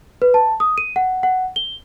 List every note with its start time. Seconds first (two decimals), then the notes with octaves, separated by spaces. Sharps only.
0.22 B4
0.34 A5
0.60 D#6
0.78 D#7
0.96 F#5
1.23 F#5
1.56 G7